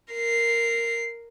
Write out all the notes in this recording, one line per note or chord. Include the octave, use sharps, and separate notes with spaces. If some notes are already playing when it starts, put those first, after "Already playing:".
A#4 C7